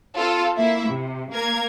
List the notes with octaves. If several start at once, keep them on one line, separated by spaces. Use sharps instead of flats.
C4 F4 A4
A#3 E4 E5
C3
A#3 A#4 G#6